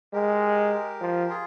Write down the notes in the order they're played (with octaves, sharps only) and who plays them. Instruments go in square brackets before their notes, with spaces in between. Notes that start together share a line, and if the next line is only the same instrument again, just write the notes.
[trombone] G#3 [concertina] G4 A#4
[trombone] F3
[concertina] F4 G#4